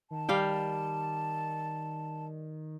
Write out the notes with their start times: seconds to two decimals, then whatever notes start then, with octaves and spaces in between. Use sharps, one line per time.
0.11 D#3 A5
0.29 G3 F5 G5